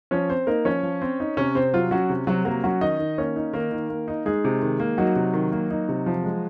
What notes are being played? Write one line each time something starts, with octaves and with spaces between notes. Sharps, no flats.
F3 C#4 C#5
C4 C5
A#3 D#4 A#4
F3 C#4 C#5
F3
C4
D#4
C3 C#4 C#5
C3 C4 C5
F#3 F4
F#3 C#4 F#4
C3
C3 F#3 F#4
F#3 A#3 A#4
F#3 C#4 F#4
D#3 D#4 D#5
D#3
A#3 C#4 C#5
D#4
D#3 A#3 A#4
D#3
A#3
D#4
G#3 D#4 G#4
C3
D#3
A#3
F#3 D#4 F#4
C3
D#3
A#3
D#4
C3
F3
G#3